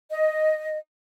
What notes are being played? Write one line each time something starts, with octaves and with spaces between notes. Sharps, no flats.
D#5